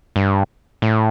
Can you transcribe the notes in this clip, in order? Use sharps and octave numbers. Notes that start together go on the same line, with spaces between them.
G2
A2